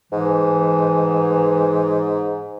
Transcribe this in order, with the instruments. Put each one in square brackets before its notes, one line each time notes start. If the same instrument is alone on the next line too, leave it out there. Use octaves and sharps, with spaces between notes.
[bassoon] G#2 [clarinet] E3